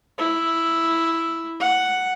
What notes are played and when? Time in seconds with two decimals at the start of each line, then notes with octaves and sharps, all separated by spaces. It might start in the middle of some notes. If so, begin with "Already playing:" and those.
0.18 E4
1.60 F#5